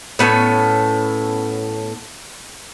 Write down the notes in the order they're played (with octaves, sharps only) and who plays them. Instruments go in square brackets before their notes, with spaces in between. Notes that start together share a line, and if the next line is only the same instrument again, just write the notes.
[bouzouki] A2 B3 C#4 A4